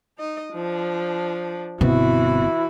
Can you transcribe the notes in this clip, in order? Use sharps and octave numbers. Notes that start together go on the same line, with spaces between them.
D#4 D#5
F3 D4
G1 B2 E3 B3 C4 E4 F#4